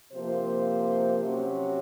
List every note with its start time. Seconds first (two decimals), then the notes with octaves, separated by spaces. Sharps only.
0.10 C3 F3 A#3 C5
1.19 C3 F#3 C#4